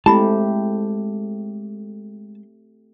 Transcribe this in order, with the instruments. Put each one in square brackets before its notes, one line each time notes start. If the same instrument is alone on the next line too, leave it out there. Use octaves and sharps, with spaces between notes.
[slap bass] G#3 [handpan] A3 C4 G4 [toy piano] E4 B5 [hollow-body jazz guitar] A5